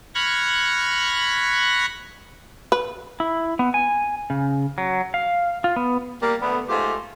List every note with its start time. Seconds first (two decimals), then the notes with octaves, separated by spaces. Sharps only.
0.15 B5 C#6 F6 F#6 G#6 A#6
2.72 B4
3.20 E4
3.59 B3
3.74 G#5
4.30 C#3
4.78 F#3
5.14 F5
5.64 F4
5.76 B3
6.21 G3 A#3
6.41 D3 A3 B3
6.69 G#2 A3 F4 G4